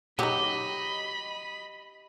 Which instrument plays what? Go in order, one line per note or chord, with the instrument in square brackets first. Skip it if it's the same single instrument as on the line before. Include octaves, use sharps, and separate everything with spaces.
[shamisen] F#3 D#4 [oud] G4 [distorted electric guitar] D#5 [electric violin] B5